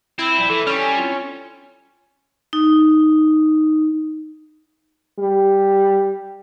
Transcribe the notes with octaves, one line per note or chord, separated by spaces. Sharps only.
C4 E4
A#2 F3 G3 C4
E3 A4
G3 C#4
C4 E4 F4
D#4
G3